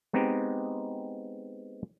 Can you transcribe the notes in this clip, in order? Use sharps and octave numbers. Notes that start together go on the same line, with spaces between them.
G#3 B3 C4 D#4 G4